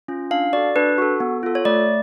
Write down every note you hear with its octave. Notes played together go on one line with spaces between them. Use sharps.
C#4 F4
D4 F5
F#4 A4 D5
D4 B4
F#4 A4
B3
F4 A4
C#5
A3 D5